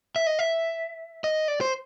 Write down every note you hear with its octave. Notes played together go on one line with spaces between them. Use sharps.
E5
D#5
E5
D#5
D5
C5